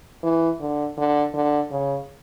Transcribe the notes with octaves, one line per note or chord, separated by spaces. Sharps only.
E3
D3
D3
D3
C#3